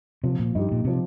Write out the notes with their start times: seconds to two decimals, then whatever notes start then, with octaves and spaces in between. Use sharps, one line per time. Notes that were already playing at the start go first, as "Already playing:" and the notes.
0.24 C3 F3
0.39 A#2
0.55 G2 D#4 G4
0.72 A#2
0.85 C3 F3